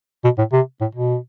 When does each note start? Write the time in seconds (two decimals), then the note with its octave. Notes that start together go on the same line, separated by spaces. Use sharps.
0.24 B2
0.38 A2
0.52 C3
0.81 A2
0.95 B2